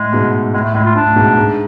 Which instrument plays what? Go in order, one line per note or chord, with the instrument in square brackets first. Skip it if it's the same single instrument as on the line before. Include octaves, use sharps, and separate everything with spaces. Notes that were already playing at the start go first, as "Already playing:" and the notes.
Already playing: [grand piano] A2 [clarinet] G#3
[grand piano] G#2 B2
[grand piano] A2 [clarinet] G#3
[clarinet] A3
[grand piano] A2 [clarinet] G#3
[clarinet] F4
[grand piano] A2 [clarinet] D4
[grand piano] A2
G#2 B2
G#2